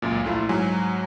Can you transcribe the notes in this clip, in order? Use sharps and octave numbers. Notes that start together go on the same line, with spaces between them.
C#2 F#2 A#2
A#1 A3 E4 F4
G#2 F#3 G#5